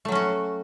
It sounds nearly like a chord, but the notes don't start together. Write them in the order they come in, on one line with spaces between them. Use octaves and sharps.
A3 F#3 C#4 F#4